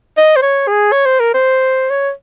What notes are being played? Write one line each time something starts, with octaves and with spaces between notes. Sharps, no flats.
D#5
C5
C#5
G#4
C#5
C5
A#4
C5
C#5